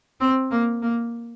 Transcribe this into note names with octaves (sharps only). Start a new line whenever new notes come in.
C4
A#3
A#3